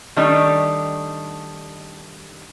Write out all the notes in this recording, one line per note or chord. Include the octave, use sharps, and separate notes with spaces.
D#3 G3 A3 D4 D#4